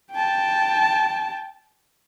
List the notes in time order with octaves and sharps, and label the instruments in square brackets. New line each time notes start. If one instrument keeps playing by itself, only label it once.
[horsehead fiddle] G5 A5